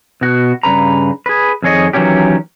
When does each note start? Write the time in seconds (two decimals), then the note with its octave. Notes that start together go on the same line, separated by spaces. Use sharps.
0.21 B2 F#4
0.63 G2 C#3 B4 A#5
1.26 G#4 B4
1.62 F2 D#3 G#4 C#5 D#5
1.93 D#3 E3 F#3 A#3 C#4 G4